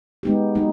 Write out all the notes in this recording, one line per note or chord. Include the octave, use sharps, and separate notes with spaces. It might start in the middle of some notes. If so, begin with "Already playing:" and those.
G#3 B3 D#4 G4
F#3 A#3 D#4